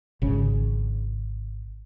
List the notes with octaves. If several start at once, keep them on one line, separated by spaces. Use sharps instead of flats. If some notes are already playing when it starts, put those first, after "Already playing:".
G#1 C#3